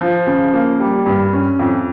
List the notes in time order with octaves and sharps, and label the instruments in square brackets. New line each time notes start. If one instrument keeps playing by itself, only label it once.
[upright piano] F3
C#3
A#3
G3
G2
C#4
F2